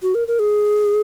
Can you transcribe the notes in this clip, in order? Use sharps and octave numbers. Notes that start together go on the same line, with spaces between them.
F#4
A#4
A#4
G#4